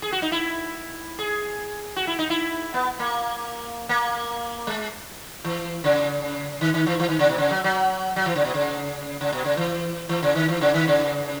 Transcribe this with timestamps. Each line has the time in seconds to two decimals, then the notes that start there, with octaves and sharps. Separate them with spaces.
0.02 G#4
0.12 F#4
0.22 D#4
0.32 E4
1.19 G#4
1.96 F#4
2.07 E4
2.19 D#4
2.30 E4
2.74 B3
2.99 A#3
3.89 A#3
4.67 G#3
5.44 E3
5.84 C#3
6.61 D#3
6.74 D#3
6.86 E3
7.00 E3
7.09 D#3
7.19 C#3
7.29 B2
7.38 C#3
7.51 F#3
7.64 F#3
8.16 F#3
8.26 E3
8.36 C#3
8.44 B2
8.54 C#3
9.21 C#3
9.33 B2
9.44 C#3
9.57 E3
10.09 E3
10.22 C#3
10.35 D#3
10.48 E3
10.61 C#3
10.74 D#3
10.87 C#3